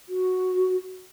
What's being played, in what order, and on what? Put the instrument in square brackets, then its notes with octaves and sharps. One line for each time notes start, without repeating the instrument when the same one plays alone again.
[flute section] F#4